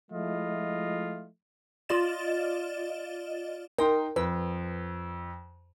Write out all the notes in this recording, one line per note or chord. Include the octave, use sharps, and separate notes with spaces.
F3 G#3 A3 E4 F4 D#5
F4 D5 D#5 A6 E7
D#4 A#4 G5 C6
F2 B4